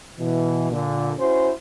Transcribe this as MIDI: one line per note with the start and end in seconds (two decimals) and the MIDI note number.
0.20 0.71 47
0.20 0.71 52
0.71 1.11 46
0.71 1.11 50
1.19 1.51 61
1.19 1.51 64
1.19 1.51 66
1.19 1.51 72